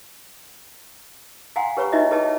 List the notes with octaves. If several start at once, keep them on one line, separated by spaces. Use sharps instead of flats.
F5 F#5 G#5 A#5 C6
G4 B4 C#5 A#5 B5 C#6
D#4 E4 F#4 B4 D#5 E5
G#4 B4 C#5 D#5 G5 A5